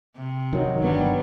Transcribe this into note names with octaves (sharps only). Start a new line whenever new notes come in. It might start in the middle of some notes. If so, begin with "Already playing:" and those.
C3
D#3 F#3
G1 F#3 G3 B3 D4